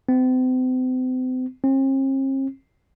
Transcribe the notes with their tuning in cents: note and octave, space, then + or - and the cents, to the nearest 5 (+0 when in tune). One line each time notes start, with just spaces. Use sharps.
C4 -40
C4 +45